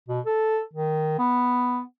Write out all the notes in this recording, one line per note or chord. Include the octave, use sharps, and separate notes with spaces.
B2
A4
D#3
B3